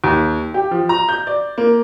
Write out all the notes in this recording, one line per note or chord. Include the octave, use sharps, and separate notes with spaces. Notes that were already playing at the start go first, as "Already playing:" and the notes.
D#2
G4
F3
A#5
G6
D5
A#3